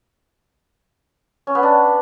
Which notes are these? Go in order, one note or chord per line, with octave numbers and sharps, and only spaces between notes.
C#4
B3
D4